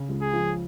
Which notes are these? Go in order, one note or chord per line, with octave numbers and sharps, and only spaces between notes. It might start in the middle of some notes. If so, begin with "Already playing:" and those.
Already playing: C#3
C#2
G#4
F3